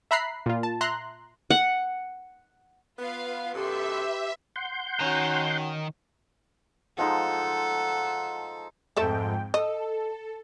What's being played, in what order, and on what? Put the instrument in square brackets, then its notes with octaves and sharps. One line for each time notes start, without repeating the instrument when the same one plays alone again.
[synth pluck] E5 A#5 B5 F#6 C7
A#2 F4
A5
E5 A#5 C6 F#6
[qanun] F#5
[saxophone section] B3 [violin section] F4 B4 F5
[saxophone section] F#2 B2 A4 [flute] G4 [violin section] B4 C6 [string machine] E5
[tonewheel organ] F#5 C6 G6
[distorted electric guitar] D#3 A#5 [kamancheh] C#4 F#4
[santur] F3 G#3 D#4 [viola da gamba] A4 [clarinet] F#5
[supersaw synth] F2 G#2 G5 [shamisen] A3 A4 E5
[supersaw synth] A4 [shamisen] D#5